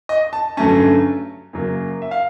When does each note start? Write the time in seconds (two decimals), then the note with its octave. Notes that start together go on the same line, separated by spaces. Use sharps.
0.09 D#5
0.33 A5
0.57 G2 D3 F#3 A3 C#4 A5
1.53 F#2 C#3 F#3 A#3
2.02 E5
2.11 F5